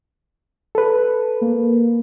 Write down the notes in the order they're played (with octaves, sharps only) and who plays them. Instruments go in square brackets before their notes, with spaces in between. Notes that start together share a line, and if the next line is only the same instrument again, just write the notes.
[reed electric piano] A4 B4
[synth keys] A#3